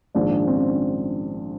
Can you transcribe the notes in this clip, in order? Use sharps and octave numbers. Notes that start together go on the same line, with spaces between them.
A#1 G#2 D#3 D4
C4
C#4